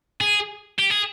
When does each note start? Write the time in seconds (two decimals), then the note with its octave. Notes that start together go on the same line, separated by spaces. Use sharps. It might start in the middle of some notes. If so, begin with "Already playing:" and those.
0.21 G#4
0.79 G4
0.91 G#4